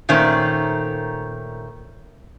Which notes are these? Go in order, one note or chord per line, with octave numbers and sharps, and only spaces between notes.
A#2 D#3 A3 C#4 C5